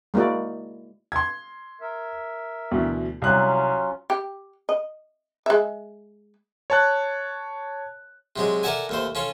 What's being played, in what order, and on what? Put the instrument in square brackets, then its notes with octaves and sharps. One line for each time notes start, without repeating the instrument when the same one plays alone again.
[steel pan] G#3 A#3 E4 F#4 D5
[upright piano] C6 G#6
[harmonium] A#4 E5
[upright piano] D2 B2 E3
[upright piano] C2 F#6 [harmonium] F#3 C#4 F4
[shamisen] G4
D#5
G#3 E5
[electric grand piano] C#5 A5 F#6
[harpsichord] C3 F#3 G#3
A4 A#4 D5 E5 F#5 G#5
D#2 A3 C5
C#4 F4 A4